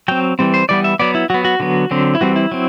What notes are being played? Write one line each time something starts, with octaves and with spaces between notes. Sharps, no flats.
F#3 C4 G5
E3 G3 C4
C5
E3 G3 B3 D5
E5
F#3 B3 D5
E4
F#3 B3 F#4
F#4
D3 F#3 B3
D3 F#3 C4
E4
E3 G3 C4 F#4
E4
F#3 C4